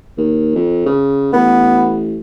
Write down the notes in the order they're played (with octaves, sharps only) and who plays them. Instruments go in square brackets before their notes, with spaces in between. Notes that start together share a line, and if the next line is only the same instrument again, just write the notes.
[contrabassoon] D#2
F2
C#3
[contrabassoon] A1 [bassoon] B3